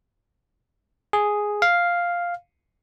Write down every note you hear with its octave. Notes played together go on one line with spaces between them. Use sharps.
G#4
F5